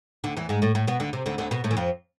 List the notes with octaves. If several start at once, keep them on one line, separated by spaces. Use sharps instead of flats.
D2 D3
E2 E3
G#2 G#3
A2 A3
A2 A3
B2 B3
D2 D3
C3
D2 D3
D2 D3
B2 B3
A2 A3
E3
F2 F3